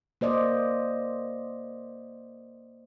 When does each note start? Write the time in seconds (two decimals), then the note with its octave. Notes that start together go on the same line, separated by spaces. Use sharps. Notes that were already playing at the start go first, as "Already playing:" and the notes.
0.21 A#3 C5 D5 D#5